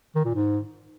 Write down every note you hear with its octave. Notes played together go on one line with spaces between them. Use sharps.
D#3
A#2
G#2